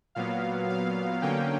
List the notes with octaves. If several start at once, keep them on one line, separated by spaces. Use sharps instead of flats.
A#2 F#3 B3 F5
F5
D3 F#3 A#3 C#4 G5